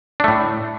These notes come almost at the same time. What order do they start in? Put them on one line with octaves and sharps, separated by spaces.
D4 A3 A2